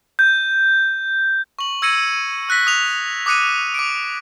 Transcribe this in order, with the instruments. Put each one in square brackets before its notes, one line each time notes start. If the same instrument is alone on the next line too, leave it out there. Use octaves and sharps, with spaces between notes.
[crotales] G6
C#6 F#7
E6 G#6 A#6 C#7 D#7
E6 F#6 A#6 B6
D#6 F7
D6 D#6 F#6 C#7 D#7
D6 D7